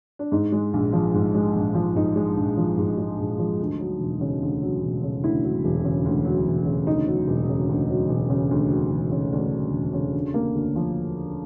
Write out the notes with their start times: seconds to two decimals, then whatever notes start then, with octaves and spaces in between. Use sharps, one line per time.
0.19 D4
0.32 G#2 D#4
0.52 G#3
0.74 A#1
0.93 F3
1.14 G#2
1.34 G#3
1.55 A#1
1.75 F3
1.96 G#2 D#4
2.16 G#3
2.37 A#1
2.57 F3
2.77 G#2
2.98 G#3
3.19 A#1
3.39 F3
3.60 D2
3.79 F#3
4.00 E1
4.21 C#3
4.42 D2
4.62 F#3
4.83 E1
5.03 C#3
5.24 D2 E4
5.43 F#3
5.64 E1
5.84 C#3
6.05 D2
6.25 F#3
6.46 E1
6.66 C#3
6.87 D2 D#4
7.07 F#3
7.27 E1
7.49 C#3
7.69 D2
7.89 F#3
8.09 E1
8.30 C#3
8.51 D2
8.70 F#3
8.92 E1
9.12 C#3
9.32 D2 D4
9.52 F#3
9.73 E1
9.93 C#3
10.14 D3
10.34 A#3
10.55 D2
10.76 F3